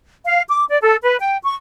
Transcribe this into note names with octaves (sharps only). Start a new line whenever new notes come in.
F5
D6
D5
A4
B4
G5
C#6